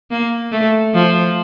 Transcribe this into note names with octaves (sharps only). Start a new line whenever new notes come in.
A#3
A3
F3